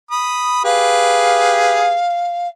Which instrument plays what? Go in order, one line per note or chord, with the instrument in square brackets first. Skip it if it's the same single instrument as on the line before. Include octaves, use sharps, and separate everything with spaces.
[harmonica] B5 D#6
[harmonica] G4 G#4 B4 [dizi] F5